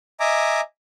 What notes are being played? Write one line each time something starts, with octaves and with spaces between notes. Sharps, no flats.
D#5 E5 G#5 A#5 D6